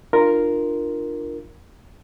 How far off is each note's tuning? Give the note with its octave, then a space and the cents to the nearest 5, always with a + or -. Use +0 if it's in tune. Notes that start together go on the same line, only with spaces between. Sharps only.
D4 +40 F4 -5 A#4 +0